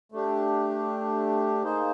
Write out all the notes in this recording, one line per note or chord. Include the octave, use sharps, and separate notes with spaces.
A3 D4 G4
A#3 D#4 G#4 C5